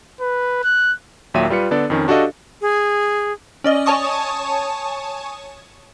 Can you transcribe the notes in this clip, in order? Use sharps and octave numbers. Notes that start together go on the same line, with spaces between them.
B4
F#6
D#2 A#2 F#3 E5 G5 D#7
G3 F4 B4 C#7
D3 B3 D4 A4 D5
F2 D#3 C#4
D4 F#4 G4 A4 D#5 F5
G#4
C#4 D5 D#5
C#5 G#5 A5 C#6 D#6